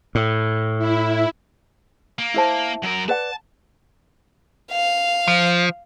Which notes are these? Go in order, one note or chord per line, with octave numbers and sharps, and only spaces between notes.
A2
E4
A#3
E4 C5 A5
F#3 A#4
B4 D5 F#5 A5
F5
F3